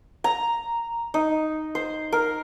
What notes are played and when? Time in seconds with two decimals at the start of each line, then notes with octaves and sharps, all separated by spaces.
0.24 A#5
1.14 D#4
1.75 C5
2.12 A#4